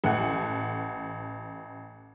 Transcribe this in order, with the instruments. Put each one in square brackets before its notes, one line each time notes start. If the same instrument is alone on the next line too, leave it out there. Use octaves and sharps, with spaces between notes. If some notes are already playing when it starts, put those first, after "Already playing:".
[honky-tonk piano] A1 A4 F#5 G#5